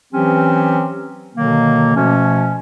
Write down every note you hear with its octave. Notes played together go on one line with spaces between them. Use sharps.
E3 F#3 C4 C#4 G4
B2 D3 D#3 F#3 A#3
B2 F3 A3 C#4